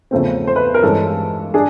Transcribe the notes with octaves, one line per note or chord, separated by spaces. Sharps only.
E2 C#3 F3 A3 C4
C5
B4
A#4
G2 E3 G#3 C#4 A4
D4 G#4